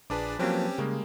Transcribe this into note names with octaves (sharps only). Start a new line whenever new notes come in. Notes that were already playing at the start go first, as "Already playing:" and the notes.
A#1 D4 G#4 B4 A5 D6
F3 F#3 A#3 C4 C#4 G4
C#3 G3 G#3 A#3